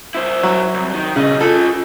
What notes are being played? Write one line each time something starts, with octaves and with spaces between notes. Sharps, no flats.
E4 C5
F#3
C2
D#3
B1 C#3 D#5
F4 G#4 A4